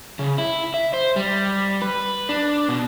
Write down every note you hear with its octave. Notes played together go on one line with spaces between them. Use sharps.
C#3
E4
E5
C5
G3
B4
D4
B2